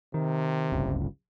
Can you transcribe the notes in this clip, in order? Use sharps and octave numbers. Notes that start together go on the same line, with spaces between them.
C3 D#3
D1 G1 C#2